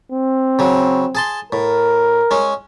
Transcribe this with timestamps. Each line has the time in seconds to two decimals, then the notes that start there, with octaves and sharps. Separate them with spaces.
0.12 C4
0.59 C#3 F#3
1.15 G#4 A5 C6
1.53 A2 A#4
2.31 G#3 C#4